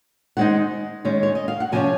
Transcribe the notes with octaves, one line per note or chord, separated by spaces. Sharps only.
D#3 G#3 C4 D#4 F#5
D#3 G#3 C#4
C#5
D#5
F5
F#5
C3 F3 A#3 C#4 G#5